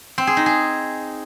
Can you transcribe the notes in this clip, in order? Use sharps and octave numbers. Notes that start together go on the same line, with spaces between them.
C4
G#4
D#4
G#4